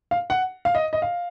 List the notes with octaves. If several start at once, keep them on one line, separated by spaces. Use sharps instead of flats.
F5
F#5
F5
D#5
D#5
F5